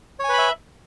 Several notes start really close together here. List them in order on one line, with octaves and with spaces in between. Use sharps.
C#5 G#5 B4 B5 E5